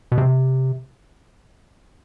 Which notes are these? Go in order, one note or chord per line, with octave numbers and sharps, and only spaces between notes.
B2
C3